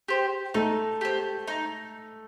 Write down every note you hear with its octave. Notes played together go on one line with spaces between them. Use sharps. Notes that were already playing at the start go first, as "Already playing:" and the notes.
G4 C5
A3 D#4
G4 C5
D#4